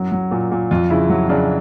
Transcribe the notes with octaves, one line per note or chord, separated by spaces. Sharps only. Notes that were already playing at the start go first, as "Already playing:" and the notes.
Already playing: F#2 F#3 E4
F#3
A#2
A#2
F2 F4
C#3 E4
F#3
C#3 D4